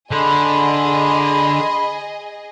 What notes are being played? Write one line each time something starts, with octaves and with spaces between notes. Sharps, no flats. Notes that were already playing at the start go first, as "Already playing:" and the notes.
D3 G#4 D#5 B5 C6